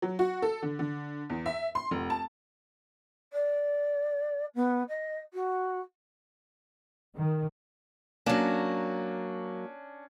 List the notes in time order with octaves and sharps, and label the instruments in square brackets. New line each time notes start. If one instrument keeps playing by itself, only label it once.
[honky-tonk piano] F#3
F#4
A4
D3
D3
E2
E5
C6
F1
A5
[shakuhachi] D5
B3
D#5
F#4
[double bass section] D#3
[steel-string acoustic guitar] F#3 A#3 [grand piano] C#4 D4 E7